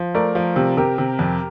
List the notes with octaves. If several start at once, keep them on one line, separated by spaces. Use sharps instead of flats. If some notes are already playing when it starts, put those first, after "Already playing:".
Already playing: F3
A3 A#4 D5
F3
C3
C3 G4 A#4
C3
F2